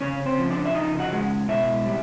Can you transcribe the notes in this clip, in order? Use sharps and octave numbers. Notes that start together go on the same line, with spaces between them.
C#3 C#4 C#5
C4 C5
F3
D4 D5
E5
C#3 D#4 D#5
F#4 F#5
G#3
B2 E4 E5
G3